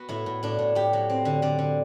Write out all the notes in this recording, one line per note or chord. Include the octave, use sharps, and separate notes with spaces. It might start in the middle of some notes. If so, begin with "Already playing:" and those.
Already playing: B3 F#4
A2 E4
A2
A2 D4
A2
A2 G4
F#3
C4
D3
D3 D5
D3